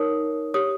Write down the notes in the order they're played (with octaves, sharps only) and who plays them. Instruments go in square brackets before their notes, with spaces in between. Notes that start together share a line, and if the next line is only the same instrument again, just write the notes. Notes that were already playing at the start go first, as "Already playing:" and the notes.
Already playing: [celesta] D#4 A#4 C#5 D#6
G4 C#5 D#6